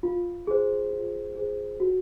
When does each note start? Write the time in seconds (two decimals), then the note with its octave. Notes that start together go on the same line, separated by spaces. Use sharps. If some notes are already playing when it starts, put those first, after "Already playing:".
0.03 F4
0.47 G#4 C5
0.91 F4
1.35 G#4 C5
1.80 F#4